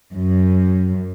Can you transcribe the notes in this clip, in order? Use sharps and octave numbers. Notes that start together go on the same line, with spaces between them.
F#2